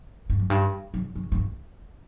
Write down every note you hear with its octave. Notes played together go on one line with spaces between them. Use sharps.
G2
F#2
G2
F#2
F#2
F#2
G2